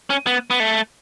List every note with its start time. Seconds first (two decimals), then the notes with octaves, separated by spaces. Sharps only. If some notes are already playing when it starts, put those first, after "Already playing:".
0.10 C#4
0.27 B3
0.50 B3
0.60 A3